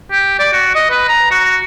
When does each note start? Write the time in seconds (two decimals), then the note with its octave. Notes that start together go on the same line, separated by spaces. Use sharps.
0.11 G4
0.39 D5
0.53 F#4
0.75 D#5
0.90 B4
1.09 A#5
1.31 F#4